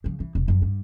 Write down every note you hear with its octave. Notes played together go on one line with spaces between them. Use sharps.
C#3 F3
E3
E1 C2
F#2 F3
G2